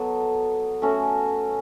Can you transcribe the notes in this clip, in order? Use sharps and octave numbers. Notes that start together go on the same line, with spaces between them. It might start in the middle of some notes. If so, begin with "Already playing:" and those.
Already playing: F#3 B3 F#4 A4
A3 C#4 F#4